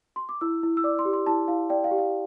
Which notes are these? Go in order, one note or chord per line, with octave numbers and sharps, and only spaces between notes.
C6
D6
E4 E6
E4
E6
D5 D6
C6
G4
C6
E4 A5
E4 F5
D5 G5
F5
G4
F5